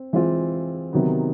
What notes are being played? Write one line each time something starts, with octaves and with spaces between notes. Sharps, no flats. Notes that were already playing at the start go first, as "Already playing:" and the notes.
Already playing: C4
E3 G#3 C4 F4
C3 D#3 F#3 B3